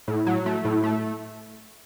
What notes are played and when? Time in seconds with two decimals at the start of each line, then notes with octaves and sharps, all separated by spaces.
0.08 A2
0.27 F#3
0.46 A3
0.65 A2
0.83 A3